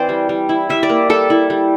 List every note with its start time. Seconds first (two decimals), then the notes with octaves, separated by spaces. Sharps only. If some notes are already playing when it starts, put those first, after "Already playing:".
Already playing: E3 C4 C5 D5
0.09 G3
0.29 G3
0.49 E4
0.69 G3 E5
0.83 D5
0.89 A#3
1.10 G3 A4
1.30 E4
1.50 G3